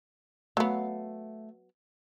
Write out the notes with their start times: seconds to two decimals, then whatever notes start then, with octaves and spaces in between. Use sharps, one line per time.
0.57 F#3 A3 B3 F5